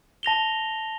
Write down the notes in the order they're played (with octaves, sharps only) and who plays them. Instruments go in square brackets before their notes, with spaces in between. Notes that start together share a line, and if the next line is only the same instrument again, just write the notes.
[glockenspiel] A5 A#6 F7 G7